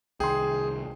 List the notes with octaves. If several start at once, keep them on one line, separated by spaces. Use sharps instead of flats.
C2 D#3 G#4 G5 C6